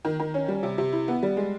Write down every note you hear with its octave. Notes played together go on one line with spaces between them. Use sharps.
D#3
D#3
C#4
G3
C3
C3
E4
B3
G3
G#3